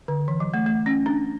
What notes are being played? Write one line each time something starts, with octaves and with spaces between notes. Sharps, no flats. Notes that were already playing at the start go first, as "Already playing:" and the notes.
D3
E3
F#3
A3
A3
C#4
D4